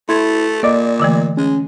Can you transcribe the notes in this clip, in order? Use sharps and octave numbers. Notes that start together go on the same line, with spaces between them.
A3 E4 C6 G#6
A#2 A#3 D5 D#5 D6
D3 E3 A3
G#3 C#4